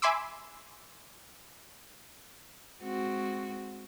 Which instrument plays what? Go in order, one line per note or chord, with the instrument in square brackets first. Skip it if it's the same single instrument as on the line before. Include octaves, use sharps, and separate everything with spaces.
[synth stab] E5 G#5 B5 C6 D6 E6
[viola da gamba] G#3 C4 F#4